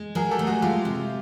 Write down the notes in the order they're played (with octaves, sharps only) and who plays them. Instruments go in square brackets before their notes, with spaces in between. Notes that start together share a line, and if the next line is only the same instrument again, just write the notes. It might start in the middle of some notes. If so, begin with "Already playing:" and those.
Already playing: [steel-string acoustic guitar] G#3
[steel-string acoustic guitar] F#3 [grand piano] G#4 A#4
[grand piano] G4 A4
[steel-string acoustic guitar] A3
[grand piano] F#4 G#4
[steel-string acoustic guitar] G#3 [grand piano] F4 G4
[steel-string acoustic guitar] C3